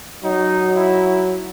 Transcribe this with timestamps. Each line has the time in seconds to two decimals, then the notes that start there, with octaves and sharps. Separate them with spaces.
0.24 F#3 D#4
0.76 E4